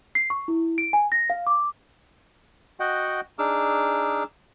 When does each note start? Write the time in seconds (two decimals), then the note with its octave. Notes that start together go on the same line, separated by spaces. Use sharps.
0.15 C7
0.30 C#6
0.48 E4
0.78 D7
0.93 G#5
1.12 A#6
1.30 F5
1.47 D6
2.80 F#4 D#5 F#5 G5
3.39 D4 D#4 G#4 D6 E6 F6